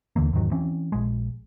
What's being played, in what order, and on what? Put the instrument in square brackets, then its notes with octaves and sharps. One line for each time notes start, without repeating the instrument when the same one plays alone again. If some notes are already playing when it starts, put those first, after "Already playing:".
[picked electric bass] D#2 D3 E3 A#3
E2 G#2 D#3 F#3
E3 C4 C#4
A#1 G#3